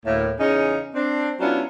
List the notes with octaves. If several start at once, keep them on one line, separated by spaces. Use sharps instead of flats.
D2 A2 A#3
E2 C#3 C#4 D#4 D#5
C4 D4
F#3 B3 C#4 D4 E4 F4